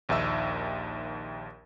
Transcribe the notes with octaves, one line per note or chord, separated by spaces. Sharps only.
A#1 D#2 D#4 E5 E6